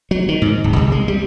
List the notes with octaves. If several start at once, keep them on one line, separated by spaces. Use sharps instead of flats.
F#3
D#3
G#2
D1
C2
G#3
G3